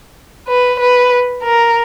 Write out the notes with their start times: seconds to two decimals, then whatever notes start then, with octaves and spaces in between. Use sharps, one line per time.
0.48 B4
0.79 B4
1.43 A#4